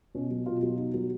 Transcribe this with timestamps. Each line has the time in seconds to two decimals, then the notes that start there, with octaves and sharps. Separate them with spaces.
0.15 B2 C#4
0.30 F#3
0.46 B2 F4
0.62 F#3
0.78 B2 D#4
0.94 F#3